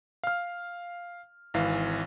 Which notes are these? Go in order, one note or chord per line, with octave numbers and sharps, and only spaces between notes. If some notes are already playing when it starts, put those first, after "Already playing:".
F5 F6
G#1 E3 F5